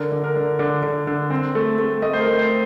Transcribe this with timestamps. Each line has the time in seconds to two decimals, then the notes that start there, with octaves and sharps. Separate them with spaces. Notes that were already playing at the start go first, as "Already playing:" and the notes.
Already playing: D3 A#4
0.12 D3
0.24 A#4
0.36 D3
0.59 D3
0.83 D3
1.07 D3
1.30 C4
1.55 A3
1.79 A3
2.02 A3 D#5
2.13 C5
2.20 A#4
2.26 A3
2.39 C5